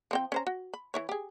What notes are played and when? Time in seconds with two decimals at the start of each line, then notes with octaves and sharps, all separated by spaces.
0.11 F3 C4 G5
0.32 C#4 C5 A#5
0.47 F#4
0.74 B5
0.94 E3 E4 C#5
1.09 G4 G#4